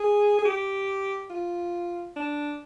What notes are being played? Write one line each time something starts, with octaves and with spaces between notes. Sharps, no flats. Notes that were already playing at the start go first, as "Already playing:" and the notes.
Already playing: G#4
G#4
G4
F4
D4